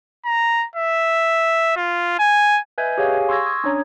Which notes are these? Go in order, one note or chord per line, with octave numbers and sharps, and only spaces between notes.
A#5
E5
F4
G#5
B4 D#5 E5 G#5 G6 G#6
G4 G#4 C#5 F5 G#5
C6 C#6 E6 G#6 A#6
D#6 G#6
C#4 D4 C#5 A#5